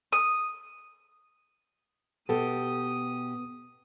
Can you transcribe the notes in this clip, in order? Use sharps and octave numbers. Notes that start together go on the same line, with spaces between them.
D#6
B2 B3 G4 A4 D#6